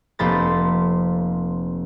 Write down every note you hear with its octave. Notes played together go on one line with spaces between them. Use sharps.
F1 A#3 B4 C5 B5 A6